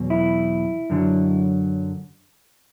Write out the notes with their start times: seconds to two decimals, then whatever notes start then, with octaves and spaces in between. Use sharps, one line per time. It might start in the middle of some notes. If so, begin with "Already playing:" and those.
Already playing: E2 B2 F#3
0.10 E4
0.90 F#2 D3 F#3